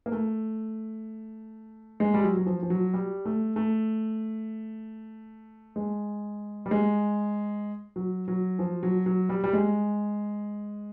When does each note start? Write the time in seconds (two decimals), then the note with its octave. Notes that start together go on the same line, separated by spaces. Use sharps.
0.06 A#3
0.12 A3
2.00 G#3
2.14 G3
2.23 F#3
2.37 F#3
2.47 F3
2.63 F3
2.70 F#3
2.94 G3
3.25 A3
3.56 A3
5.76 G#3
6.66 G3
6.71 G#3
7.96 F#3
8.28 F#3
8.59 F3
8.83 F#3
9.06 F#3
9.29 G3
9.44 G3
9.53 G#3